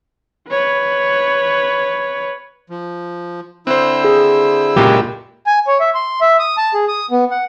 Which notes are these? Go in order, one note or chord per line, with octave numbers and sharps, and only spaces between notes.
B4 C#5
F3
D3 C4 E4 C5 E6 F#6
G#4
C#2 F#2 A#2 G#3 A#3 G4
G#5
C#5
E5
C6
E5
D#6
A5
G#4
D#6
B3
F#5